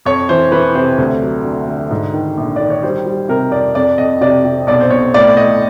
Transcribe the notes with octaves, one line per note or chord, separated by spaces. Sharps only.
F2 C#5
E3 C5
E3 B4
C3 C5
D2
F#3
D3
D3
G#2
D#3
A#1
D#3 D5
C#5
G3 C5
G3
C3 A#4
F2 D5
F2 D5
F2 D#5
C3 D5
C3
B1 D5
C5
B1 C#5
A2 D5
A2 D#5